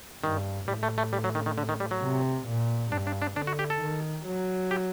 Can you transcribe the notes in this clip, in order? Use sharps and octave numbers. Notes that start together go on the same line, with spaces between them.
G2 D#3
A2 G3
A3
A3
G3
F#3
D#3
D#3
D3
D#3
G3
F#3
C3
A#2
G2 D4
D4
D4
D3 D4
F#4
G4
A4
D#3
F#3
G4